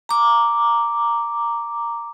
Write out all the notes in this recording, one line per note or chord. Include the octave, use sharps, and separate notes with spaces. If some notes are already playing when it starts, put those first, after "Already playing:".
A#5 D6